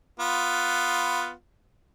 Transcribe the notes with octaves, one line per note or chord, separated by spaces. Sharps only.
B3 F4